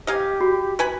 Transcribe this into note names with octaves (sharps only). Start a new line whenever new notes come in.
G4 D#5 F5 G#5
F#4
B4 G#5 B5